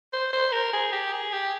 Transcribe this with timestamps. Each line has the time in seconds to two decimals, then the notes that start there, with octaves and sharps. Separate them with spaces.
0.13 C5
0.33 C5
0.52 A#4
0.73 G#4
0.93 G4
1.12 G#4
1.33 G4